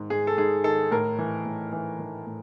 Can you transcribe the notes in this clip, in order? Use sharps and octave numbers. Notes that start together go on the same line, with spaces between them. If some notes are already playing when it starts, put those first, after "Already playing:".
Already playing: G#2 D#3
G#2 G#4
A4
G#2 G#4
D#3 A4
A2 A#4
E3
A2
E3
E3
A2